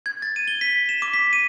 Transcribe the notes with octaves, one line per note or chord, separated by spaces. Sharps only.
G#6
A6
D#7
G7
B6
E7
D6
B6
D#7